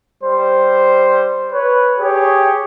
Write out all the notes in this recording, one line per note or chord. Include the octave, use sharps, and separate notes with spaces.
G3 C5
B4 C#5
G4 G#4 C#5